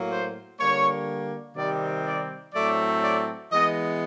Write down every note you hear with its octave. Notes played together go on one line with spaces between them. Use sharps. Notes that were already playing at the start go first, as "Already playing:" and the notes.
Already playing: A2 F#3 A#3
C5
D3 G3 A#3 C#5
C3 D#3 G3 C4 D5
D5
A2 F#3 A3 C4 D5
D5
E3 G#3 B3 D#5